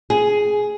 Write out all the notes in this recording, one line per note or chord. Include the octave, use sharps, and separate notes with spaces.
G#4